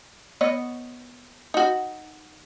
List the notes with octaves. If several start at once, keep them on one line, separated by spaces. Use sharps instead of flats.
B3 C#5 D#5
D#4 F#4